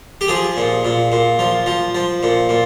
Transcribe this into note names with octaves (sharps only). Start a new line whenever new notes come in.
G4
F3 G#4
A#2
A#2
A#2
F3
F3
F3
A#2
A#2